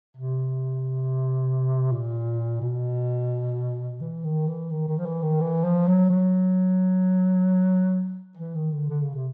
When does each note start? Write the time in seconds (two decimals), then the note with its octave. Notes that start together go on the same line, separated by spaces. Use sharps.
0.17 C3
1.91 A#2
2.61 B2
4.01 E3
4.24 D#3
4.48 E3
4.70 D#3
4.88 D#3
4.98 F3
5.06 E3
5.23 D#3
5.41 E3
5.64 F3
5.87 F#3
6.10 F#3
8.37 E3
8.55 D#3
8.72 D3
8.89 D3
9.02 C#3
9.15 C3